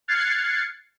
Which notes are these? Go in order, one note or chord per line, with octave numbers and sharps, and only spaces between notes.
F6 F#6 G#6 A6 C7 C#7